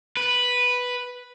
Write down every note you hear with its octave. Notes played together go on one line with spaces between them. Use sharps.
B4